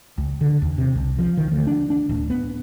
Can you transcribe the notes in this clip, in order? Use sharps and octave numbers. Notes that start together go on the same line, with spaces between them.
C#2
D3
D#2
C3
C2
F3
D#3
D2
D4
D4
D1
B3